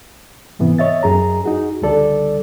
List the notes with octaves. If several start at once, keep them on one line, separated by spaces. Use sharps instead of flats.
G#2 C3 E3 B3
C#5 D#5 E5 A6
F#2 G#4 A#5
D#4 F#4 G#4
C#2 D3 G3 A4 D5